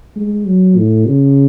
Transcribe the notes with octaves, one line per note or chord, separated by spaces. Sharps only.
G#3
F#3
A2
C#3